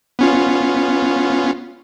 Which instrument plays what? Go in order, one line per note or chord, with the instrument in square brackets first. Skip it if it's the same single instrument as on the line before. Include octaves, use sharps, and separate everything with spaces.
[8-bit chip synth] B3 C#4 F4